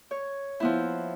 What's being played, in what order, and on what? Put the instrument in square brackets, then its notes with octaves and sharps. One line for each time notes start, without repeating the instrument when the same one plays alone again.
[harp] C#5
F3 B3 E4